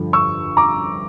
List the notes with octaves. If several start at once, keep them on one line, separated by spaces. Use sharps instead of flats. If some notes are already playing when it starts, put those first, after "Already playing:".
Already playing: G2 D3 F3
C#6 E6
A#5 D6